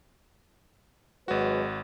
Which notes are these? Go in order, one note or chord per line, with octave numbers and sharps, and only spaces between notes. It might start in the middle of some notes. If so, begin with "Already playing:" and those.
G#1 F#3 G#3 F#4 B4